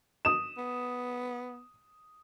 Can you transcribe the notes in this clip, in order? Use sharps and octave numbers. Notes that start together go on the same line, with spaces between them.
D#6 E7
B3